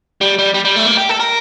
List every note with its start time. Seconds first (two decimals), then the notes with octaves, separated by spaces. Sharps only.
0.21 G3
0.38 G3
0.54 G3
0.65 G3
0.76 A3
0.86 A#3
0.97 G4
1.09 A4
1.20 A#4